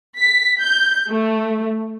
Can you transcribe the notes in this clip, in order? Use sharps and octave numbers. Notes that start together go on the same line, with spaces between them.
B6
G6
A3